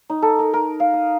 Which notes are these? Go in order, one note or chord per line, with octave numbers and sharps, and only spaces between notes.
D#4
A4
A#4
A#4
F5
D#6